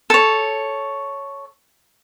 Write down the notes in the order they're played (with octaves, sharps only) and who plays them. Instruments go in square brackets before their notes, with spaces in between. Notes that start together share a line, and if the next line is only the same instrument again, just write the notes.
[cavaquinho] A4 C#5